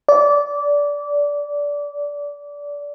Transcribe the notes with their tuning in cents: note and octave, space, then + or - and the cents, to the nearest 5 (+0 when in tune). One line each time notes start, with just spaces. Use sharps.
D5 -20